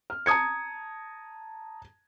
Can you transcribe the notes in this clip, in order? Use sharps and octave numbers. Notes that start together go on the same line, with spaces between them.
F6
A5 A#5 D#6 G#6 C#7